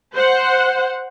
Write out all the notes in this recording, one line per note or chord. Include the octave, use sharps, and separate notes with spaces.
C5 F#5